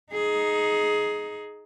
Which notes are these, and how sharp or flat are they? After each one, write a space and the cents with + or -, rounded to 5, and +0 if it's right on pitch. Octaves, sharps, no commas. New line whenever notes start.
D#4 +0 G#4 +15